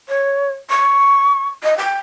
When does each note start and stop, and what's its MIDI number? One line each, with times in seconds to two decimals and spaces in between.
0.08 0.51 73
0.69 1.46 85
1.63 1.77 75
1.77 1.97 79